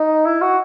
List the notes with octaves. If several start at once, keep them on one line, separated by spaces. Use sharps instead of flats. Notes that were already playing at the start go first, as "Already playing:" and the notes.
Already playing: D#4
E4
F#4